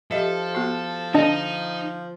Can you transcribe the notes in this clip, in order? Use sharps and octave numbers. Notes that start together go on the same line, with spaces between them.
F3 G4 A4 D#5 E5
B3 F#4
D3 D4 D#4 D#5 A5